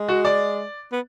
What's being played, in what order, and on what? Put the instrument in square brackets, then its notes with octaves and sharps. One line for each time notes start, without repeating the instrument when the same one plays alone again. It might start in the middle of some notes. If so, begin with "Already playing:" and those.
Already playing: [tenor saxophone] G#3
[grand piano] F#4
D5
[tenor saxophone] B3